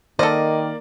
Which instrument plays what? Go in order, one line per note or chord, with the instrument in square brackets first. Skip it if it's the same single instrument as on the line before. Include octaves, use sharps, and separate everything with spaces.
[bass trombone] D#3 [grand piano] A#3 A#4 D5 [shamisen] A4 C5 [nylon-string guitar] D#5